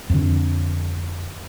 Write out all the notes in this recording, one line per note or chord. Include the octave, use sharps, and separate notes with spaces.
F2 D3